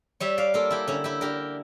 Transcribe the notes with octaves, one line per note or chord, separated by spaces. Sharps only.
G3 C#5 E5
D5 F5
A#3 F4 A4
E4 G4
D3 C#4 E4
E4 G4
D3 G4 A#4